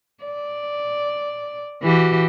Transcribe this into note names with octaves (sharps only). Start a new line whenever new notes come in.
D5
E3 F#4 G4